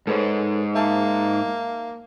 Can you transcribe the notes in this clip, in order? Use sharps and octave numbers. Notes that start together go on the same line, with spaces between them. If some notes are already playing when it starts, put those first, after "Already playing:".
G#2 G#3 A4 B4 C#5
A#3 E5 A5